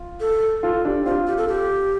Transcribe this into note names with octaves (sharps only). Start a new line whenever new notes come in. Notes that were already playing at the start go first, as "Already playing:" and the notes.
Already playing: F4
A4
F4 A4
D4 G4
C4 F4 G4
G4
A4
G4